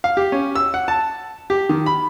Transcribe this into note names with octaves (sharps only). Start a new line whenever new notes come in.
F5
G4
C#4
E6
F#5
A5
G4
D#3
B5